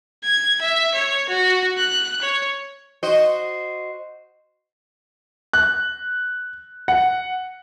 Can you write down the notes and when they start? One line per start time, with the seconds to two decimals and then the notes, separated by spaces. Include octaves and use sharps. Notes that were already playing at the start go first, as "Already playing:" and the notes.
0.23 G#6
0.61 E5
0.94 C#5
1.29 F#4
1.77 F#6
2.22 C#5
3.03 F#4 C5 D#5
5.53 F#6
6.88 F#5